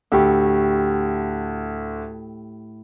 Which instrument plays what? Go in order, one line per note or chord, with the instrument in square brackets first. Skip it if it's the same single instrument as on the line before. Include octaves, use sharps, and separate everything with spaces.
[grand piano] D2 [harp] A2 G4 C#6